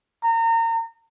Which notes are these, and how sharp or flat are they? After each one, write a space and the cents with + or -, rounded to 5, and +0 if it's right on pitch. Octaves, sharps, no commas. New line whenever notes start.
A#5 -30